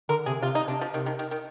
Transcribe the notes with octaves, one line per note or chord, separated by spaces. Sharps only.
D3 A#4
C3 G#4
C3 F4
D#4
C3 D4
F3
C3 D#3
D#3
D#3
D#3